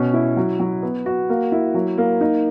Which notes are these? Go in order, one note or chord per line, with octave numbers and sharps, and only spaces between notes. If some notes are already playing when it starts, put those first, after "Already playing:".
Already playing: B2 C#4
E4
F#3
F#3
B3
F#4
A#3
E4
F#3
A#3
D#4